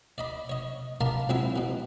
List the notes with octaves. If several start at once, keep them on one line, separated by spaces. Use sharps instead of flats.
D5 D#5 B5
C#5 D#5
A#4 D5 F5 A5 B5 C6
C#2 F#3 C4 E4 E5
B2 E3